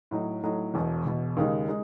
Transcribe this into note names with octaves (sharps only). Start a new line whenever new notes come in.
A2 F#3 A3 D#4
A2 F#3 A3 D#4
E1 E2 B2
E1 E2 B2
D#2 C#3 G#3 D#4
G#3 D#4